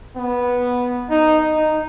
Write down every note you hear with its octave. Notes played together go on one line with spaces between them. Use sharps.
B3
D#4
D#4